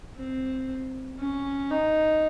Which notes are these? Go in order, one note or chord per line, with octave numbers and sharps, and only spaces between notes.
C4
C#4
D#4